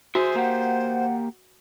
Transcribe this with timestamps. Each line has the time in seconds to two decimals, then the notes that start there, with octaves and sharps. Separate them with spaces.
0.15 F#4 G#4 C5 E5
0.35 A#3 G4 F#5